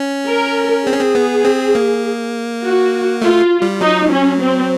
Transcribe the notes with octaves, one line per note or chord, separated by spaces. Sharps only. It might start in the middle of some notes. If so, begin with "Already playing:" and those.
Already playing: C#4
A#4
C4 G#4
C#4
C4
B3
C4
A#3
F#4
A3 F4
G3
F#3 D#4
C#4
C4